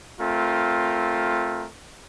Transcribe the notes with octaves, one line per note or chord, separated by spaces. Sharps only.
A3 C4 F4 A#4